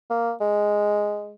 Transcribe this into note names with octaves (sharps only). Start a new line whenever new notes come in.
A#3
G#3